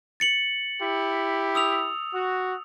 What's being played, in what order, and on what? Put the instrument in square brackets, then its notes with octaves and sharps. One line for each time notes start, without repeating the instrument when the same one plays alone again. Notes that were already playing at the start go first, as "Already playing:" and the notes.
[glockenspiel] A6 C#7 F#7
[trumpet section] E4 G4
[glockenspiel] D#6 E6 F7
[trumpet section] F#4